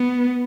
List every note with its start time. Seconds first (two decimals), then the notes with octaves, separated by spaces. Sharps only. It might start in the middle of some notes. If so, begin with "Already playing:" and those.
Already playing: B3